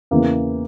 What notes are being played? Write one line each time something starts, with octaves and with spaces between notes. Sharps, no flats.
E2 C#3 E3 A#3